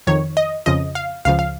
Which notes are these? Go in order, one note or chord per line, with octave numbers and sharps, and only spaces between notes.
F2 D#3 C#5
D#5
F2 C#3 F3 D#5
F5
C#2 C#3 F3 F5
F5